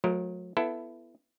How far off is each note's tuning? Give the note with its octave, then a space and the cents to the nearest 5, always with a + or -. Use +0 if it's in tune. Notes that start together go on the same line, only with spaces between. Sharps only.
F#3 -40 A3 -30 A#4 +0
B3 +5 E4 +20 A4 +0